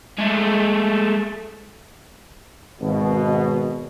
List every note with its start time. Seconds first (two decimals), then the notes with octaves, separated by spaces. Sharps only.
0.19 G#3 A3
2.80 G#1 B2